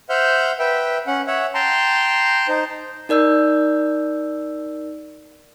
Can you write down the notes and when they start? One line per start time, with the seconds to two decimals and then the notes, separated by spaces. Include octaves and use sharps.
0.09 C5 E5 F#5 F6 G6
0.59 B4 E5 G5
1.07 C#4 F#5
1.27 C#5 E5 F#5
1.54 G5 A5 A#5 C6
2.48 D#4 C5
3.09 D#4 A#4 D5 E6 G6